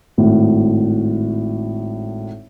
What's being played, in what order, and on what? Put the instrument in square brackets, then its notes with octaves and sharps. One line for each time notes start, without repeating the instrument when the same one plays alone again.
[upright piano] G#1 A2